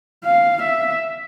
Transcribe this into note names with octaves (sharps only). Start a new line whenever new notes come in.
F5
E5